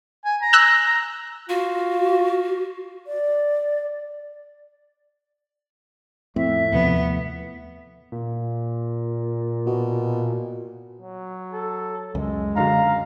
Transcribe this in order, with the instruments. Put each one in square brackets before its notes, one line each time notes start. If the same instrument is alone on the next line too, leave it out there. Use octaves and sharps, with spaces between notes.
[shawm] G#5
A#5
[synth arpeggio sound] E6 F#6
[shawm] A#5
[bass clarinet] F4 [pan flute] F#4
[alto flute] D5
[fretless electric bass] F2 A2 [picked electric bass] C4 [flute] E5
[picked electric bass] D#2 C3 F3 [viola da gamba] B3
[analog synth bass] A#2
[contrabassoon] B2
[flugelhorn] F#3
[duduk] A4
[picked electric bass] C#2 F#2 [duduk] G#3
[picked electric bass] F#2 D3 F#3 [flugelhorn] F5 [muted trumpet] A#5